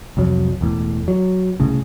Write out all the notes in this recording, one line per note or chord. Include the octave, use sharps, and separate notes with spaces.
C2 F2 F#3
E1 E2 A2
F#3
C2 A2 C#3